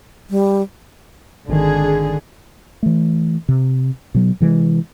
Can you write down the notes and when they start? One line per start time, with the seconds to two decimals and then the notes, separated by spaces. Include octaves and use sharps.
0.30 G3
1.49 G#1 D3 D#3 G#4
2.83 E3 A3
3.49 C3
4.15 B2 F#3
4.40 C3 E3 F#3 G#3